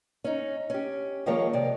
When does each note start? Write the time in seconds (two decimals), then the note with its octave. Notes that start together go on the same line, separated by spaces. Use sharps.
0.24 C#4 D#4
0.70 C#4 G4
1.26 D#3 F3 G#3 A#3 G4 C#5
1.53 C3 D5